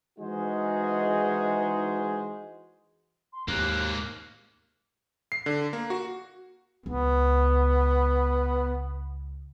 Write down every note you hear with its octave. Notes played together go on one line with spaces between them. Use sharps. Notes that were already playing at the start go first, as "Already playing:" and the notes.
E3 G#3 D#4 F#4 G#4 C5
C6
D#2 G#2 A#3 F#6
C7
D3
A#3
F#4
C#2 B3